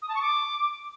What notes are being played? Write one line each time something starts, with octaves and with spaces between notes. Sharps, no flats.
D#6
A5
C#6
D6